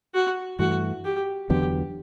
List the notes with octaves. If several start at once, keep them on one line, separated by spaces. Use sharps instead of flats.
F#4
G2 E3 A3 F#4
G4
E2 D3 F#3 B3 G4